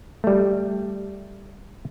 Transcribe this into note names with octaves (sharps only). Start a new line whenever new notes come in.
G3 A3